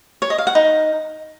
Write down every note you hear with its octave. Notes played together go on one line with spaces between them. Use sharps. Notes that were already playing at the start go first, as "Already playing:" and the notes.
C#5
D#5
F5
F#5
D#4